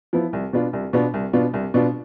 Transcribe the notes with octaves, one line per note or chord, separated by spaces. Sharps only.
F3 B3 E4
C2
B2 B3 D4 F4
C2
B2 B3 D4 F4
C2
B2 B3 D4 F4
C2
B2 B3 D4 F4